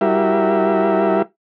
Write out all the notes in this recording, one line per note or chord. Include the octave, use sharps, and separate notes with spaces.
G3 E4 F#4 G4 A#4 E5